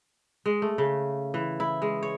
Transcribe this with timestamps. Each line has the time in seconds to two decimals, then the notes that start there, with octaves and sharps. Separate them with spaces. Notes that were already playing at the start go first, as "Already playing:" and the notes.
0.46 G#3
0.62 A3
0.78 C#3
1.34 E3
1.60 E4
1.82 G#3
2.03 C#5